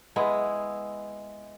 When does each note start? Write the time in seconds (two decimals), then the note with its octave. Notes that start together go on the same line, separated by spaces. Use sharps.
0.16 G#3 B3 E4